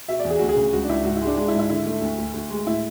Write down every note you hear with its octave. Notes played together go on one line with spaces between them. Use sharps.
B2 E5
D5
E2
G#4
D2 F#4
G#4
C#3
C#2 F#4
D4
C#2 E4
G#2 F#4
G#3 E4
D4
G#3 D4
E4
G#2
E4
D3 E4
A3
D2
D2
D2
G#3
A2 E4